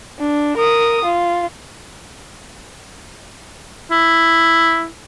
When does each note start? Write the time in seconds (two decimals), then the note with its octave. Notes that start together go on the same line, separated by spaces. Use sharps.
0.19 D4
0.57 A#4 D#6
1.05 F4
3.91 E4